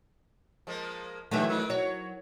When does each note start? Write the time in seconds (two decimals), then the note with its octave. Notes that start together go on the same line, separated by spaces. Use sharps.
0.67 F3 G#3 A#3
1.31 D3 E3 F#3 A3 G4 E5
1.49 D#3 D#4
1.70 F#3 C#5